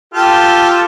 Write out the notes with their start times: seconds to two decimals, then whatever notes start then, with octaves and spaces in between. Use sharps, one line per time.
0.14 F4 G4 A4